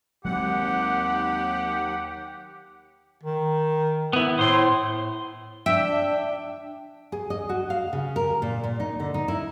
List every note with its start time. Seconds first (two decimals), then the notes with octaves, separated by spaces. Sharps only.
0.25 D#2 F#3 G#3 C4 G4 F#5
3.23 D#3
4.13 B3 E4
4.39 A2 C5 C6
5.66 D4 E5 G5
7.12 G#4
7.30 D#5
7.49 F#4
7.70 F5
7.93 C#3
8.16 A#4
8.42 A#2
8.64 A#2
8.80 D#4
9.00 D3
9.14 D#4
9.28 E4